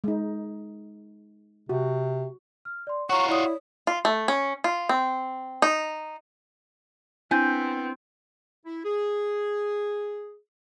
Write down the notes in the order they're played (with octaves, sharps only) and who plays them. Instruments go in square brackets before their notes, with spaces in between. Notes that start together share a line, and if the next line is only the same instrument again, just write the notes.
[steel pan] G#3 D#4
[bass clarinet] C3 [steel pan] F#4
[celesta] F6
D5 C6
[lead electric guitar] F4 F#4 [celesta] C#5 A#5 [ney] C#6
[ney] E4 [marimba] C#5 D#6 [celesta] D5
[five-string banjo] F4
A3
C#4
F4
C4
D#4
[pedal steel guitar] B3 G6 [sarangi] C4 [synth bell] D4 E4 [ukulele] G#5
[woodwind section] E4
G#4